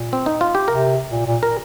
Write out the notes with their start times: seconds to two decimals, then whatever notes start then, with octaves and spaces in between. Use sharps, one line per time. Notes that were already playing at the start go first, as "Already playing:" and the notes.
Already playing: A#2
0.13 C4
0.26 D#4
0.41 F4
0.55 G4
0.68 C3 A#4
1.11 A#2
1.27 A#2
1.43 A#4